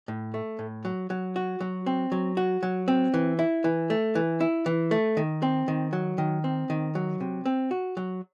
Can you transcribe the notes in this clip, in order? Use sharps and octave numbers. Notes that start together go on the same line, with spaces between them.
A2
A3
A2
F#3
F#3
F#4
F#3
C4
F#3
F#4
F#3
C4
E3
E4
E3
A3
E3
E4
E3
A3
D#3
C4
D#3
F#3
D#3
C4
D#3
F#3
C3
C4
F#4
F#3